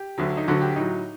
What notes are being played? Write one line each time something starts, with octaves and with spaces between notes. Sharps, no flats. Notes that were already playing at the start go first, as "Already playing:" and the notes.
Already playing: G4
D2 D3 F#3
D#4
D2 D3 F#3 F#4
G4
A2 F#3 D#4